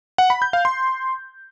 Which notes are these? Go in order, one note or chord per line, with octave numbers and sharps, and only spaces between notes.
F#5
B5
G6
F5
C6